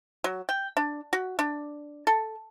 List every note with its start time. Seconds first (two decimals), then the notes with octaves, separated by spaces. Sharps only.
0.24 F#3
0.49 G5
0.77 D4
1.13 F#4
1.39 D4
2.07 A4